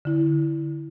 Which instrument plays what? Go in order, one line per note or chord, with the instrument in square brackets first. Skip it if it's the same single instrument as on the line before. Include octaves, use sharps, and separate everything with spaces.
[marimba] D3 E4